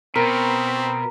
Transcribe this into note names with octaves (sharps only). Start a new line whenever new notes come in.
B2 C4 A#4